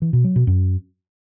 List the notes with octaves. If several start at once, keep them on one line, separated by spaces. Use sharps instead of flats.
E3
B2
F#3
B2
F#2